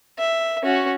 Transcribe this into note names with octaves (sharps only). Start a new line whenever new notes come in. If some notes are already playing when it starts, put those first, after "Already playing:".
E5
C#4 F#4